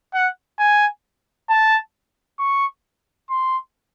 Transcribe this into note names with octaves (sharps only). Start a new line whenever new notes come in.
F#5
G#5
A5
C#6
C6